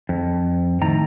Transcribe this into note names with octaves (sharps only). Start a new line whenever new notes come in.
F2
A2 D#3 A#5